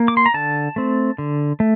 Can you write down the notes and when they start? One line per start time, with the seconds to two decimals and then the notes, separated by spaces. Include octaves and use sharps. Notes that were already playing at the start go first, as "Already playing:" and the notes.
Already playing: A#3
0.08 D6
0.17 C6
0.26 A#5
0.34 D3 A5
0.76 A3 C4
1.18 D3
1.60 A3